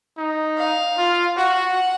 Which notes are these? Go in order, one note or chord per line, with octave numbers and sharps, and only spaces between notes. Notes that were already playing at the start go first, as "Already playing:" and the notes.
D#4
F5
F4
F#4 F#5